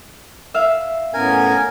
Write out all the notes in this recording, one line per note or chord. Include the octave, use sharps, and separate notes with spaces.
E5 F5
A2 B3 C#4 A#4 G#5